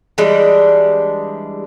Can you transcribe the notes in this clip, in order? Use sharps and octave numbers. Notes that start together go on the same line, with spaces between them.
E3 G3 G#3 D4